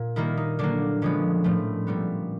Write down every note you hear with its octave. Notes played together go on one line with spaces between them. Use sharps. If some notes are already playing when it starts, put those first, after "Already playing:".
Already playing: A#2
D#3 G3 A#3 E4
D#4
D3 F#3 A#3 D4
D3 F3 G#3 B3 C#4
A2 F3 A3
A#2 G3 B3